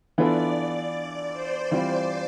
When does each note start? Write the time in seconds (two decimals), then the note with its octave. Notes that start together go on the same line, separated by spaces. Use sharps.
0.18 E3 B3 D4 F4 A4 D5
0.94 D5
1.33 C5
1.71 E3 G3 C4 F4 C5